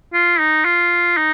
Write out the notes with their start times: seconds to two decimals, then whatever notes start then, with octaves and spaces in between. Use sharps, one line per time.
0.13 F4
0.40 D#4
0.65 F4
1.17 D#4